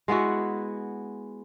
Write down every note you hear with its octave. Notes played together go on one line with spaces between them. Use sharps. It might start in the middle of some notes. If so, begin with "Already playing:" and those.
G#3 B3 E4 F#4